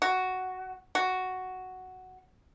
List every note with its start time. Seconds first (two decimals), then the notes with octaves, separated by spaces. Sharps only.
0.02 F#4
0.95 F#4